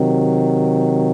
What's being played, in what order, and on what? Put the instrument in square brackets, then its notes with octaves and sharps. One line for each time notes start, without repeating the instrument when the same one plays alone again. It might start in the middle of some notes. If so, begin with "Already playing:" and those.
Already playing: [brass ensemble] C3 D#3 F#3